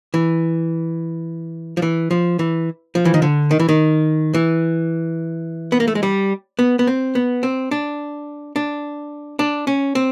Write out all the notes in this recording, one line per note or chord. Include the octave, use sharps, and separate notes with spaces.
E3
F3
E3
F3
E3
F3
E3
D#3
D3
D#3
E3
D#3
E3
B3
A#3
A3
G#3
G3
B3
B3
C4
B3
C4
D4
D4
D4
C#4
C4